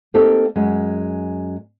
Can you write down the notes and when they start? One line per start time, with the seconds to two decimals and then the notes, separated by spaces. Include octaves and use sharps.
0.14 A#3 C4 D#4 G4 A4
0.56 F#2 G#3